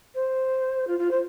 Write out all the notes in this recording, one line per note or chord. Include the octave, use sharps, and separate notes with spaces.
C5
F4
F4
C5